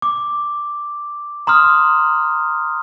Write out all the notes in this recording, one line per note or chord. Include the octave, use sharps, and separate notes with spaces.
D6
A#5 C6 D#6 F6